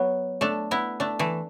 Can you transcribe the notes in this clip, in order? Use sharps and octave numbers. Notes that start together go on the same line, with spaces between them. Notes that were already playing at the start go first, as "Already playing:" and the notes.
Already playing: F#3 B3
A3 D4
B3 E4
A3 D4
E3 A3